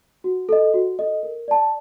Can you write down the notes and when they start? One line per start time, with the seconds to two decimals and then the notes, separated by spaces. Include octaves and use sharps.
0.24 F#4
0.49 A4 D#5
0.74 F#4
0.99 A4 D#5
1.23 A#4
1.48 D5 A5